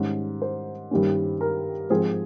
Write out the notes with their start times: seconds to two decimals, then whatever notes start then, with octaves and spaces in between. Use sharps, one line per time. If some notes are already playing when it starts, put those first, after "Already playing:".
Already playing: G#2 D#3 G3 C#4
0.42 C5
0.91 G2 D#3 G3 A#3 C#4
1.41 A#4
1.90 G#2 F3 C4 G#4